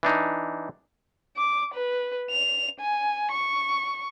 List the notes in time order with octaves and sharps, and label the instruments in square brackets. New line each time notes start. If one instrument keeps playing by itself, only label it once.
[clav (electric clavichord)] E3 D4 D#4
[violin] D6
B4
F7
G#5
C#6